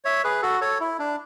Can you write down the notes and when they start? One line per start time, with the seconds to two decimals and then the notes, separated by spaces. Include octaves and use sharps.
0.05 C#5 E5
0.24 G#4 B4
0.42 F#4 A4
0.61 A4 C#5
0.80 E4
0.99 D4